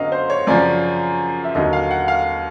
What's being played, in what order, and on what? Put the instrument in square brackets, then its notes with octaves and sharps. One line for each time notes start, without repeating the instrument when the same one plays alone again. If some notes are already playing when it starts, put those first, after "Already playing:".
Already playing: [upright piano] F#2 D3 F#3 B3 D#5 F5
C5
C#5
F#2 C#3 F3 D5
E5
D#2 D3 F#3 D#5
F5
F#5
F5